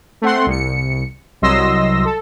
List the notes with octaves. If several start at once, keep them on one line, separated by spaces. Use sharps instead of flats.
A3 C4 F#5 C6
C2 C#7
C2 F#3 D#5 C6 E6 A#6
A4